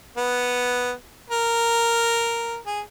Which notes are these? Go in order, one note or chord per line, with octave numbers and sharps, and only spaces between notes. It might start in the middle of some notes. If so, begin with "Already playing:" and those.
B3
A#4
G#4